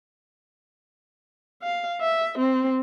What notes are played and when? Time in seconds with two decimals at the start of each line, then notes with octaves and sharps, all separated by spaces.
1.62 F5
2.01 E5
2.38 C4